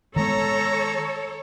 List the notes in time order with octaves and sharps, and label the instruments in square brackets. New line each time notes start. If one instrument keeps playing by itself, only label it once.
[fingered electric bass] D#3 G#3 B3 [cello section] A4 C#5 [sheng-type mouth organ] A#5